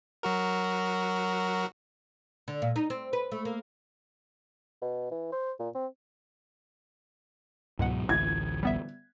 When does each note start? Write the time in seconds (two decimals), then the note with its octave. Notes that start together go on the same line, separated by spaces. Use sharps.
0.23 F#3 F#4 A#4
2.48 D3
2.62 A#2
2.76 D#4
2.90 C4
3.13 B4
3.32 A3
3.45 A#3
4.82 B2
5.11 E3
5.32 C5
5.59 A#2
5.75 C4
7.79 C#2 G#2 B2 F#3 G#3 F#5
8.09 A1 D2 G#6
8.63 G3 B3 E5